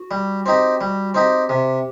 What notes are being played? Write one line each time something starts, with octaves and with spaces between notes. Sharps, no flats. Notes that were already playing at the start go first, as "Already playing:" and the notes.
Already playing: F#4
G3
C4 D#4 G4
G3
C4 D#4 G4
C3 G4